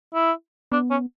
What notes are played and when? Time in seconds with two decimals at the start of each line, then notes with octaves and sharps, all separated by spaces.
0.14 E4
0.72 B3 D4
0.91 C#4